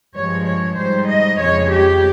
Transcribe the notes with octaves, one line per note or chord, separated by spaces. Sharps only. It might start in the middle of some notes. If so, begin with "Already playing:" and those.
G2 F3 G#3 C#5
C#5
G#2 G3 C5
D#5
F2 C#3 G#3 C#5
G4